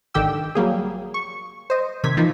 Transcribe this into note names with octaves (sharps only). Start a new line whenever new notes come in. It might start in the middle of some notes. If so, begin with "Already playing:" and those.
G#1 D3 D#3 G4 G5 E6
F#3 G3 A#3 G#4
C#6
C5 D#5
C3 D#3 G#6 B6
E3 F3 A#3 D#4